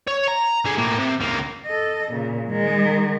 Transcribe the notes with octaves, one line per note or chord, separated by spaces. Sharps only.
C#5
A#5
D3 G#4
A2 A#3
C3
C#2 A#3
A4 D#5
A#2 C#3
D#3 G#3